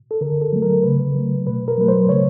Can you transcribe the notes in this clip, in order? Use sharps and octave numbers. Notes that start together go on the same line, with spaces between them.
A4
D3 A#4
A4
F#3 A3
A#4
C#3 B4
F#3 A3
B2 B4
A#4
F#3 A3 B4
C5
C#3 C#5